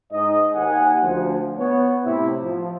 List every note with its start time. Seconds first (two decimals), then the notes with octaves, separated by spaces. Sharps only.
0.12 G#2 D#4 G#4 D#5
0.54 D#2 F#5 G#5
1.02 D2 F3
1.57 B3 C#5
2.04 A2 C3 E4
2.41 F3